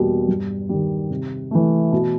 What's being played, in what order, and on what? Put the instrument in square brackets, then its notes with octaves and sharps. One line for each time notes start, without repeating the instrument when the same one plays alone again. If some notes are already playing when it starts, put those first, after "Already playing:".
Already playing: [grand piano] E2 B2 G3 A#3
G2
D#3 G3
C3
E3 A3
B2